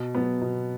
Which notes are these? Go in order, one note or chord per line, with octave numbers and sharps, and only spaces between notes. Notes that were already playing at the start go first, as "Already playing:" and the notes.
Already playing: B2
F#3 B3
B2